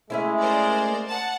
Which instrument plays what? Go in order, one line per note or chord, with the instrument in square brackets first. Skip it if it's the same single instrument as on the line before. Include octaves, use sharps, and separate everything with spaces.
[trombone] G#3 [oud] A3 C#4 E4
[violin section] A#4 C5 D5
F#5 A5